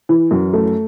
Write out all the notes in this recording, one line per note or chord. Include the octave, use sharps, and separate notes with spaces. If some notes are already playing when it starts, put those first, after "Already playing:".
E3
F#2
A3